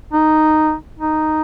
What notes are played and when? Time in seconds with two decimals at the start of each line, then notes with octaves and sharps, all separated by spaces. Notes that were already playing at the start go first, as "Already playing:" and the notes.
0.13 D#4
0.99 D#4